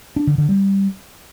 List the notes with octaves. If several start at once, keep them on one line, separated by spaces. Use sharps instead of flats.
D4
D3
D3
G3